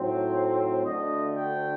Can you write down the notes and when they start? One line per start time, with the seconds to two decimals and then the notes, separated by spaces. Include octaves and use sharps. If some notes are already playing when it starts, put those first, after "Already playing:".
Already playing: A2 F#3 A3 C4 D#4
0.84 D2 D3 A3 D#5
1.36 G5